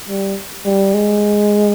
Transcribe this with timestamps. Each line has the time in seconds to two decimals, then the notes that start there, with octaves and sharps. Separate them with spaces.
0.09 G3
0.66 G3
0.94 G#3